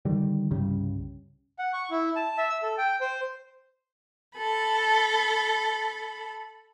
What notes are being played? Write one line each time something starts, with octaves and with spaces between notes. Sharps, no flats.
D3 D#3 G3
C2 G2 C#3 G3
F#5
C#6
E4
A5
E5
E6
A4
G5
C5
A4 B5